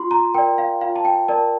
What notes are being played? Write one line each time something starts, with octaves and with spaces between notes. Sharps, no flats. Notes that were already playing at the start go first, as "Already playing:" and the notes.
Already playing: F4 C6
A#5
A#4 D5 G5
F5
F4 F5
A5
G5
A#4 D5 A5